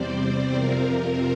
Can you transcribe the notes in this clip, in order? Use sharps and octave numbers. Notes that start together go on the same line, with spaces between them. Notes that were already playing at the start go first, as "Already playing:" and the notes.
Already playing: E2 C3 G3 C4 C5 D5
C5
F2 C3 F3 C4 A#4